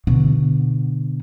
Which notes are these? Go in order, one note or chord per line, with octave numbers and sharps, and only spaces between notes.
B2 D3